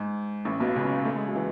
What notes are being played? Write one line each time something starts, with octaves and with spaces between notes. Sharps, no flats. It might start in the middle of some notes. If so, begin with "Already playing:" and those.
Already playing: G#2
A1 A2
B1 B2
C#2 C#3
A3
G#3
F#3
E3